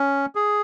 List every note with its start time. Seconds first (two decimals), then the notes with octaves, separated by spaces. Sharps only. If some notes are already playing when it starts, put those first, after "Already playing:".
Already playing: C#4
0.35 G#4